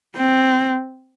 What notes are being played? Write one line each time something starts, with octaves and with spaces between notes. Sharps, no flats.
C4